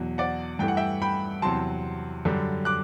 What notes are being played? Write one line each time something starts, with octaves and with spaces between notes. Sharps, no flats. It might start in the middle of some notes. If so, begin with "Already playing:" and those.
Already playing: E2 B2 F#3
D5 F#5
G2 E3 A3 G5
F#5
E5 G5
G5 B5
E2 C3 F#3 A5 C6
F#2 D3 G3
D6 F#6